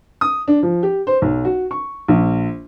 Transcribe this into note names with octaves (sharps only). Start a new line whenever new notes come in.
D#6
D4
F3
G4
C5
B1
F#4
C#6
A#1